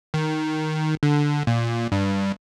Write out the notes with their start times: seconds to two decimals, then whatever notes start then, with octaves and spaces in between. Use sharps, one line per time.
0.14 D#3
1.03 D3
1.47 A#2
1.92 G2